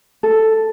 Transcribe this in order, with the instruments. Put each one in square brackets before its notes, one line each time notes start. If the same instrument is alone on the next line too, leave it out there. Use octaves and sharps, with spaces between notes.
[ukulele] A4